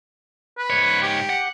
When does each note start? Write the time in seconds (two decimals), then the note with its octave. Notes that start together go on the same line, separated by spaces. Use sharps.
0.58 B4
0.70 G#2 C#5
1.02 G4
1.29 F#5